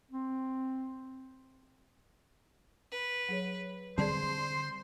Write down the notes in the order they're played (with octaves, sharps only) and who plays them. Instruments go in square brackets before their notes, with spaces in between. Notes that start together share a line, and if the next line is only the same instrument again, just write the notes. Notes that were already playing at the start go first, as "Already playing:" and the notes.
[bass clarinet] C4
[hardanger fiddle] B4
[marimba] F#3 G#4 C#5
[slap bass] D3 G3 C4 [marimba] G#4 D5 A5 [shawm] C5 [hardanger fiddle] C6